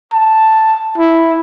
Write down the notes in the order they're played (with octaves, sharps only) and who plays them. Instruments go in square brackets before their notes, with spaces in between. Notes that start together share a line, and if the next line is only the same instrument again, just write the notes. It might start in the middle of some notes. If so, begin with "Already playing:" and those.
[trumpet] A5
E4